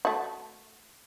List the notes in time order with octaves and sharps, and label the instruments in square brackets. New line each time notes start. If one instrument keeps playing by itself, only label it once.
[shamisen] A3 F#4